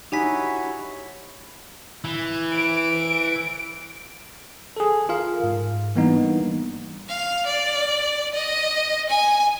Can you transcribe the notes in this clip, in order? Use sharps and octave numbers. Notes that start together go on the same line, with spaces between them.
D#4 E4 F#4 G4 C#5 G#5 B6
E3
D7
G#4 A4
F4 A#4 F5
G#2
E3 G3 A#3 B3 D4 D#4
F5
D5
D#5
G#5